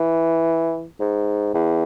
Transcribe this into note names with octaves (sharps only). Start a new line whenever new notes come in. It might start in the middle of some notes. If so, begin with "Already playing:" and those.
Already playing: E3
G#2
E2